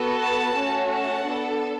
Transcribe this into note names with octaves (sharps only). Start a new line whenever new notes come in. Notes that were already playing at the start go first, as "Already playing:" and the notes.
Already playing: B3 F#4 A4
F#5 A5
A3 C#4 F#4 A4
F#5 A5
B3 D4 A4